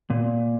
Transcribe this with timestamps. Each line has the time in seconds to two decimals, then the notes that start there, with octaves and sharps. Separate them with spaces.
0.10 A#2